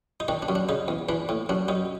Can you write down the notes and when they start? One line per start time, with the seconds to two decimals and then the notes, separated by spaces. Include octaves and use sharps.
0.20 D#4
0.28 D#3 D4
0.42 D4
0.49 F#2
0.55 D4
0.69 C#3 D#4
0.88 E2
1.09 E3 D4
1.29 A2
1.49 F#2 D4
1.68 F#2 D#4